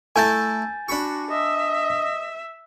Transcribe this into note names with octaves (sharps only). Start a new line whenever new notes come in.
A3 E4 G#5 A5 G6 A6
D4 F#4 B5 C#6
D#5 E5